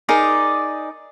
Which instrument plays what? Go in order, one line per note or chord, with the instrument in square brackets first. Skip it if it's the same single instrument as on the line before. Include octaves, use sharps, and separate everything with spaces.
[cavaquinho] D#4 G#4 A#4 D5